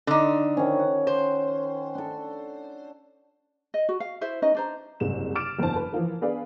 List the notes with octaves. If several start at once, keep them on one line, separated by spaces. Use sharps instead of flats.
D3 D#4
D#3 F3 C#4
F#5
C5
D4 A4
D#5
F#4
F5
E4 C5 E5
C#4 D#4 B4 D#5
D4 C5 A#5
F#1 C2 C3 G#3 E7
D6 F6 A6 D7 E7
F#1 E2 D3 E3 C5 A5
B4
E3 F3 F4 A#4
B3 D4 G#4 B4 D5 F5